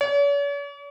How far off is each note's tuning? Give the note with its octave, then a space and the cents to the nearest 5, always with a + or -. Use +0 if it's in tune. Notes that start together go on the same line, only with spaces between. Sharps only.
C#5 +45